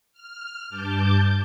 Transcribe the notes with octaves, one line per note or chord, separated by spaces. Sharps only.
F6
G2 A5 D6 G6